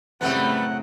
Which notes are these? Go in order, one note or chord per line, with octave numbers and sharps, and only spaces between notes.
F#2 A2 C#3 G3 A3 B3 C4 F#5